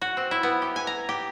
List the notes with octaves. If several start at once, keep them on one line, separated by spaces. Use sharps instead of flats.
F#4
C4
E4
B3
G4
G#5
A#5
G4